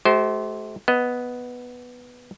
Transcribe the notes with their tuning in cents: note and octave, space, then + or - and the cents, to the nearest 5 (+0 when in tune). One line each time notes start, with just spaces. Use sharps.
A3 -40 F#4 +40 C5 +0
B3 +0 D#5 +5